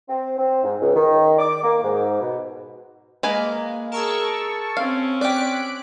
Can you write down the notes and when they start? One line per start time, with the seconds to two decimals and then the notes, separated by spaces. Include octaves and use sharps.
0.08 C4
0.37 C4
0.63 G#2
0.81 C#2
0.95 D#3
1.39 D6
1.63 A#3
1.83 G#2
2.21 B2
3.23 G#3 A#3 B4 G#5
3.92 G#4 A#4 A5 C#6 E6
4.77 C4 C#4 F5
5.21 G4 D5 F#6 B6 D7